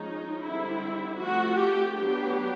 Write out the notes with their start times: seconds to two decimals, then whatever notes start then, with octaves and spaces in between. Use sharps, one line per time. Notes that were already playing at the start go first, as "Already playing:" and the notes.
Already playing: F3 G#3 C#4 D#4
0.43 D3 G3 C4 E4
1.19 F3 A3 C4 F#4
1.57 G4
1.94 F#3 B3 D4 G4